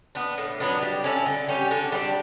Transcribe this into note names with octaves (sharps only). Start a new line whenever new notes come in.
B3 D4
A2
F#3 B3 D4
G3
C#4 E4 A4
D3
G3 C#4 G4
D3
G3 D4